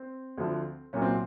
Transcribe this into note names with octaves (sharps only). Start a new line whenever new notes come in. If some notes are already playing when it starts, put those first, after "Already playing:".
Already playing: C4
D2 D3 F3
C2 A#2 F#3 C#4
C4